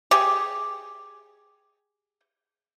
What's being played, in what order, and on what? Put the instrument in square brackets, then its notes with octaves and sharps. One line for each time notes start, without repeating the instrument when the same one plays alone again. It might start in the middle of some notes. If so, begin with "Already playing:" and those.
[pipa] G4 G#4